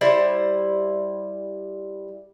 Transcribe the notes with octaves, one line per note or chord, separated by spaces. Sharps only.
G3 E4 C5